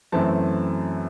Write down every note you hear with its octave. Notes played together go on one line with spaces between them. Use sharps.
F#2 E3 A3 C4 A5